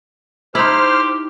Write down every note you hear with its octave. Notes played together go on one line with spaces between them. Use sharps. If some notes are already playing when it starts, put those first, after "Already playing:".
D#4 E4 G4 C5 F6